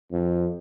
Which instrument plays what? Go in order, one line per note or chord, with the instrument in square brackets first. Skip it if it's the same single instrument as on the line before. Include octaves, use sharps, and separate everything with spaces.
[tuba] F2